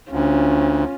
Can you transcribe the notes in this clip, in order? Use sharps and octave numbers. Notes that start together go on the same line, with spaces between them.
D2 C#4 F4